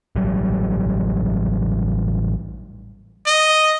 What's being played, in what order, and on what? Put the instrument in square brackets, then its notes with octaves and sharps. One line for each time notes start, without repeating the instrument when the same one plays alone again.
[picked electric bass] A1 F#3 G3
[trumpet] D#5